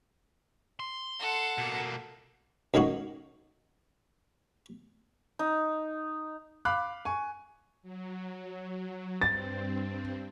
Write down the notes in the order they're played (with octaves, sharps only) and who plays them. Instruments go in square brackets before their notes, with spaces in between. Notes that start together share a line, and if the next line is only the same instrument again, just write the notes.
[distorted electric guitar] C6
[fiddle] A4 F#5
[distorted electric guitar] B2 A#3
[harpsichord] F#2 D#3 G#3 D#4 F#4
[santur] D#4
[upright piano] F5 B5 D6 F#6
G#5 C#6
[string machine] F#3
[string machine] G2 C4 [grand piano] A6